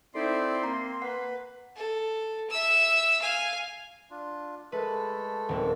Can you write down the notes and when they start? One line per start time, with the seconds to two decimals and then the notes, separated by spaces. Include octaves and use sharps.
0.15 C4 D#4 E4 A4 D5 C6
0.63 A#3 C4 A#5
1.02 B4 F#5
1.76 A4
2.50 E5 E6
3.21 F5 G#5
4.10 D4 F4
4.72 G#3 A3 A4 B4
5.49 D#1 C4